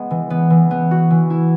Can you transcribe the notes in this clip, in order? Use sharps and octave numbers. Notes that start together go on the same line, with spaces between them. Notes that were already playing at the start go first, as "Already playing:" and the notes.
Already playing: G#3 B3
E3
B3
E3
B3
F#4
E3
E4